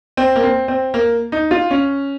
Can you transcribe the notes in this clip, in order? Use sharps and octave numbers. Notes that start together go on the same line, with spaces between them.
C4
A#3
C4
C4
A#3
D#4
F4
C#4